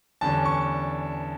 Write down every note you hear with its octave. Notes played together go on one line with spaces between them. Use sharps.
E2 D3 G3 C#4 A5
C#6